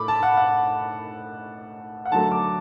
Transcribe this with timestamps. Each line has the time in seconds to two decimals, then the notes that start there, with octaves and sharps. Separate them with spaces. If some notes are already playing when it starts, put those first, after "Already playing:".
Already playing: A2 A3 B5 D6
0.08 A5
0.23 F#5
0.37 F#5
2.06 F#5
2.12 D3 F#3 A3 A5
2.32 D6